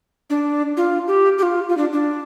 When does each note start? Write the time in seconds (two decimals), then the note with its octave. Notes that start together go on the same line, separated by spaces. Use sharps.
0.30 D4
0.77 F4
1.07 G4
1.38 G4
1.43 F4
1.69 F4
1.77 D4
1.93 D4